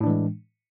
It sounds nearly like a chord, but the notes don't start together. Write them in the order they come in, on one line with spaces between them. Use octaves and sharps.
A2 D4 E3 G#3